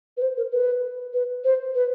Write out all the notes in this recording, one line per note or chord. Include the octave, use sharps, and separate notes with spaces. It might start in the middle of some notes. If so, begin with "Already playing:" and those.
B4
C5
A#4
B4
B4
C5
B4